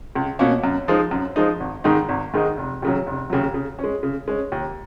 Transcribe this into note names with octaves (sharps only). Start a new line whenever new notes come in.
C#2
B2 A#3 C#4
F#2
F3 G#3 D#4
F#2
F3 G#3 D#4
G#1
G#2 D#3 G#3 D#4
G#1
G#2 D#3 G#3 D#4
F1
D#2 C#3 F#3
F1
D#2 C#3 F#3
C#3
C#4
G#3
C#3
G#3 C#4
D#2